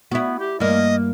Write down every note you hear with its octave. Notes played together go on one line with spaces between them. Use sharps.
B3 E4 F#4
G4
G2 A#3 D#5